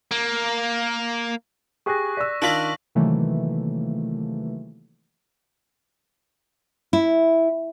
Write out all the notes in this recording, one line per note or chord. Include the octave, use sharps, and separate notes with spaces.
A#3
G4 G#4 G#5 C#6 F#6 A#6
D5 E6 B6
D#3 D4 F4 D5 A#6 B6 F#7
C3 D#3 E3 F#3 A3 A#3
E4